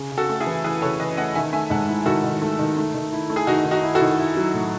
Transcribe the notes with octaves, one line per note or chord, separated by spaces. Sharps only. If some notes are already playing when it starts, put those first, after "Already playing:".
Already playing: C#3
C#3
F#4 A4
A3
E4 G#4
E3
E3 G#4 B4
C#3 A4 C#5
E3 B4 D#5
A3 D#5 F#5
D#3 E5 G#5
A3 E5 G#5
G#2 F#5 A5
E4
D#3 F#4 A4
D#3
A3
D#3
A3
D#3
E4
A3
G#4
D#3 D#4 F#4
D#3
D#4 F#4
E4
F#4 A4
D#3
E4
F#3
A2